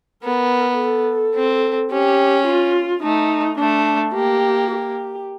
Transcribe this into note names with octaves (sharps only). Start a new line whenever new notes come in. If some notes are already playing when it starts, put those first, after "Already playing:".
B3 A#4
A4
C4
C#4 G4
F4
A3 D#4
A3 D4
A#3 G4
G4